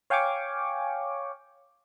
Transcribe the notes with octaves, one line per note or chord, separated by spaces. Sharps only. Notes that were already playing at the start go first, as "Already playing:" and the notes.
C#5 F5 G5 G#5 C#6 D6